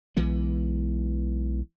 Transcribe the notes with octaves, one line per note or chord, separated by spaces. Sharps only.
B1 E3 G#3 B3